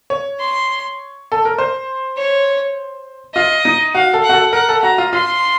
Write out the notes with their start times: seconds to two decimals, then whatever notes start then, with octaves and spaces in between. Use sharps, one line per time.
0.10 C#5
0.40 C6
1.32 A4
1.45 A#4
1.58 C5
2.17 C#5
3.35 F4 D#5
3.65 D#4
3.95 F#4 F5
4.13 A4
4.24 F#5
4.29 F#4
4.33 A4
4.53 A#4 F#5
4.69 A4
4.82 F#4 A#5
4.98 F4
5.13 F4 C6